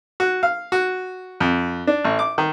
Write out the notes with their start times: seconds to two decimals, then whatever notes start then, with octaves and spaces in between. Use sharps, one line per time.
0.20 F#4
0.43 F5
0.72 F#4
1.40 F2
1.87 D4
2.05 A1
2.19 D6
2.38 D#3